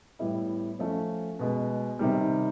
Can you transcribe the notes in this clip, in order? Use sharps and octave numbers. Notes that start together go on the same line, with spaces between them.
A2 E3 G3 B3 E4
F3 A3 C#4
B2 G#3 B3
C3 D#3 G3